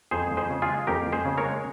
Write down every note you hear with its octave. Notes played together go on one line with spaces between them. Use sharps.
F2 G#4 C5
F2
G#4 C5
C#3
F4 G#4
G#3
F2 G4 A#4
F2
G#4 C5
C#3
A#4 C#5
G#3